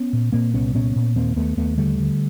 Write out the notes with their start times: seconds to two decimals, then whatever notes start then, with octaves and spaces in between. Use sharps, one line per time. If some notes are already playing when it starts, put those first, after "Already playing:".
Already playing: B3 C#4
0.13 A#2
0.32 A#2 A#3 C4
0.54 C2 B3 C#4
0.75 A#2 B3 C#4
0.96 A#2
1.16 D#2 A#3 C4
1.36 D#2 A3 B3
1.57 D#2 A3 B3
1.78 D3 G3 A3
1.99 D3